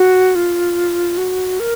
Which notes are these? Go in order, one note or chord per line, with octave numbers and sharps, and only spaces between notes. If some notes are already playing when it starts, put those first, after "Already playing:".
Already playing: F#4
F4
F#4
A#4